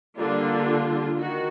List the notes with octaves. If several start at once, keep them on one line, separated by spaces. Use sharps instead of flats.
D3 G3 A#3 D4 F4
D#3 F#4